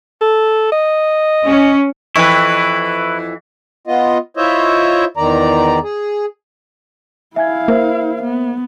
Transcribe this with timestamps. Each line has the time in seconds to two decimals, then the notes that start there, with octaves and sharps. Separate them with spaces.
0.21 A4
0.72 D#5
1.48 C#4
2.16 F2 E3 E4 B4 C#6
3.87 B3 F4 D#5
4.37 E4 F4 C5 C#5 D#5 E5
5.17 E2 D#3 D5 A#5
5.83 G#4
7.36 E4 E5 F5 G#5 G#6
7.68 A#3 A#4 C5 E5
8.23 B3